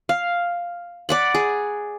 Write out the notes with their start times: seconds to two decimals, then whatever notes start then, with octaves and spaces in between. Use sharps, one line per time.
0.09 F5
1.09 D5 F#5 B5
1.34 G#4